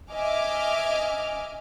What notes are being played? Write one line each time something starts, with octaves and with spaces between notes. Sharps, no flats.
D#5 E5 G#5 D6 F6